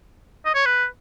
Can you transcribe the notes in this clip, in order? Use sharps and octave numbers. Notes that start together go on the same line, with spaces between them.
D#5
C#5
B4